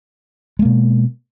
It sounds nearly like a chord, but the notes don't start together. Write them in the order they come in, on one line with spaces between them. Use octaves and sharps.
G#3 A#3 B2